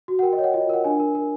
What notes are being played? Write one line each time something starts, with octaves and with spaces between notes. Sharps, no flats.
F#4
F#5
A#4 G5
D#5
C#5
F#5
F4 D#5
A#4 F#5
D4 G#5
A#4
A#4